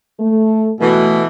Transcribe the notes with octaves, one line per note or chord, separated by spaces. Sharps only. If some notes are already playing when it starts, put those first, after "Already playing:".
A3
B2 E3 A3